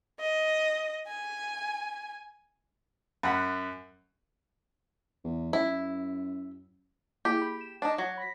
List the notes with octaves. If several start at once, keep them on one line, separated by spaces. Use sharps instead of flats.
D#5
G#5
F#2 F#5 B5
E2
F#2 E4
A#3 E4 G4 G#4
B5
E7
D4 D#4
F#3
B5 A#6 B6